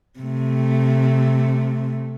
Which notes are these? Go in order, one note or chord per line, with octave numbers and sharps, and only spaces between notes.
C3 A3